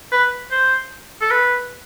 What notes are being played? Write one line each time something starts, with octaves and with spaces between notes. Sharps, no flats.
B4
C5
A4
B4